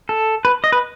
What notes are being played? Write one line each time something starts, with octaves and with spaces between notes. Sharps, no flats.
A4
B4
D#5
B4